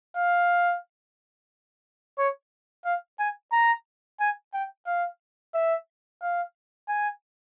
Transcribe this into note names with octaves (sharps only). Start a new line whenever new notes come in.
F5
C#5
F5
G#5
A#5
G#5
G5
F5
E5
F5
G#5